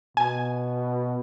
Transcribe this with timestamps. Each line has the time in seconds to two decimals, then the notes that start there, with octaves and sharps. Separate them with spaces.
0.17 B2 G#5